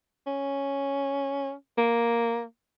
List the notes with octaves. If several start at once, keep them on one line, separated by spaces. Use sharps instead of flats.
C#4
A#3